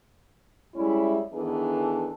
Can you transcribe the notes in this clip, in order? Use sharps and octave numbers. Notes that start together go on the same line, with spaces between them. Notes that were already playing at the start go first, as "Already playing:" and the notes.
G3 G#3 C#4 E4
D#3 E3 B3 D4 G#4 A4